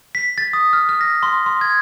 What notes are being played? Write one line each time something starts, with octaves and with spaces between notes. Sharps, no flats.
B6
A6
D#6
F6
F6
A#6
C6
C6
G#6